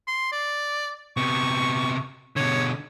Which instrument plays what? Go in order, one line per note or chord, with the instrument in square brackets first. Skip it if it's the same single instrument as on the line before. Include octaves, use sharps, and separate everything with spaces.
[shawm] C6
D5
[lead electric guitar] C3 B3 [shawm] C#6
[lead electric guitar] B2 D3 [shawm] C#5